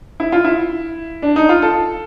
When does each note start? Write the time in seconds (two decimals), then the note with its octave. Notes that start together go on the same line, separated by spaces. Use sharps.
0.20 E4
0.32 F4
0.44 E4
1.22 D4
1.36 D#4
1.49 F4
1.62 A4